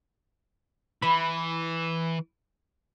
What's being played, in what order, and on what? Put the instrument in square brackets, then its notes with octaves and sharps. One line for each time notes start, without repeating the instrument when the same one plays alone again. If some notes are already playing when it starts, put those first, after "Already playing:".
[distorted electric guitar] E3 [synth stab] B5